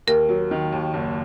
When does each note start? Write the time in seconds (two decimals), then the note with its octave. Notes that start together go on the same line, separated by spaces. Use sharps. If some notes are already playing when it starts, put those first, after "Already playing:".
0.07 D#2 A#4
0.29 F#3
0.51 D#3
0.73 D#2
0.94 F#1